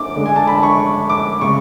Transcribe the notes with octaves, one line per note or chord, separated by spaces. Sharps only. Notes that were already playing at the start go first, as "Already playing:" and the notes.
Already playing: D6
D3 G#3
G#5
A5
B5
C#6
D6
C#3 G#3 C#6